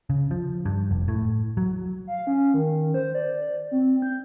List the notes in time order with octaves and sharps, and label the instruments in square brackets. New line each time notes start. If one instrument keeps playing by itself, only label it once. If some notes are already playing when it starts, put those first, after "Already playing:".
[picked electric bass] C#3
F3
G2
F1
A2
F#3
[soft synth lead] F5
C#4
D#3
C5
D5
C4
G6